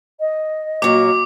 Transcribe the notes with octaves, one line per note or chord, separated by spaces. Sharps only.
D#5
A#2 F#3 D6